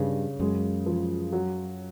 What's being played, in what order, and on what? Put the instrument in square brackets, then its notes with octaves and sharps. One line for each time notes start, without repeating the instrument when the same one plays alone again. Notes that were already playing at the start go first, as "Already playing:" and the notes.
Already playing: [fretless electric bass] G2 [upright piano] C#3
[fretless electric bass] F#2 [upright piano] G#3
[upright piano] F3
F#3